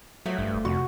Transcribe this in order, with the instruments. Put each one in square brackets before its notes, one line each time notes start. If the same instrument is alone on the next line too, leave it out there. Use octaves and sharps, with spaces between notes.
[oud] F3 A3 [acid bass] F#3
[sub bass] G#1 [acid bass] G2
[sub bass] E1
[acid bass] F2 [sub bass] C3 [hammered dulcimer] F#4